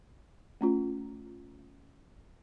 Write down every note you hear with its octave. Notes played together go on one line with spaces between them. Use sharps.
A3 C#4 F4